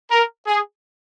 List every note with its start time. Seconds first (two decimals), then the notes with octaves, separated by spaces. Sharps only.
0.11 A#4
0.47 G#4